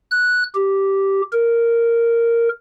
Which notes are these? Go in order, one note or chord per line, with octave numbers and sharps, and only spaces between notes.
F#6
G4
A#4